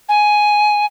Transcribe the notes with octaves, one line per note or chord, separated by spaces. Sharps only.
G#5